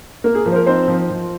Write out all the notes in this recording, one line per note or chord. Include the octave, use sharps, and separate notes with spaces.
A#3 A#4
G#4
F3 A#4
C5
A#4
C4 D#4 C5
F3
F3